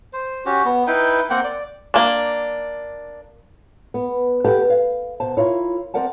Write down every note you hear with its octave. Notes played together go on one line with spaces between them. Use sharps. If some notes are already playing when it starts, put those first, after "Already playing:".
C5
C#4 F#4 G4
B3
D#4 E4 B4 G5
A#3 C4 F#5 G5
D5
A#3 D4
B3
G4 A4 B4 F#5 G5 A5
F5
B2 C5 A5
E4 F4 A#4 C#5
C4 A#4 D5 F#5 A5